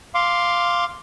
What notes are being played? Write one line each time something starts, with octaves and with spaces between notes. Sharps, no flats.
F5 C6 D6